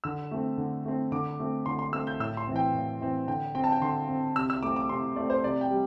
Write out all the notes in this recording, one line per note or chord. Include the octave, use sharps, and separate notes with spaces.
D3 E6
A3 C4
D3
A3 C4
D3 D6
A3 C4
D3 C6
C6
A3 C4 E6
G6
A2 E6
C6
E3 C4
G5
A2
E3 C4
D3 G5
C4 G5
A5
G5
D3 C6
C4
C3 E6
E6
A3 C4 D6
D6
C3 C6
A3 C4 D5
C5
C3 D5
G5
G3